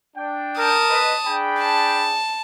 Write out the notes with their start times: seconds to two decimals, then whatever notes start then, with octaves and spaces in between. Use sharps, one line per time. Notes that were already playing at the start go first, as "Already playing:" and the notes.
0.17 D4 G5
0.59 A#4 A5 D#6
0.90 B4 D#5
1.27 D4 G#4 G5 B5
1.60 A5